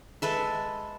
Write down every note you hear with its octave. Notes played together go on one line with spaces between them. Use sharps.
G#3 A4 B4 E5